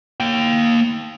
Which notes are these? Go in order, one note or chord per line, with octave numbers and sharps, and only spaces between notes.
A#3 G5